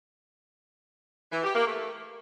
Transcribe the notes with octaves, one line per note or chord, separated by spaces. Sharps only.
E3
G4
A#3
A3